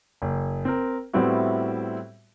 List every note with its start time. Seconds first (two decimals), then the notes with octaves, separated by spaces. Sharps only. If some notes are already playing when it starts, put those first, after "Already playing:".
0.22 F#1
0.65 C4 A#4
1.13 A2 G3 B3 C4 E4 F#4